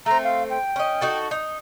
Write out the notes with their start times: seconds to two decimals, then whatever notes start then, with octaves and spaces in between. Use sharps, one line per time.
0.06 A3 C4 A#5
0.24 F5
0.50 G5
0.76 C#4 D#5
1.01 D#4 F#4 A4
1.31 D#4